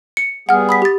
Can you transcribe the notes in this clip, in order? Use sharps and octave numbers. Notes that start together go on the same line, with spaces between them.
C#7
G3 B3 G#4 F#5 F6
B5 D#6 B6
G4 A6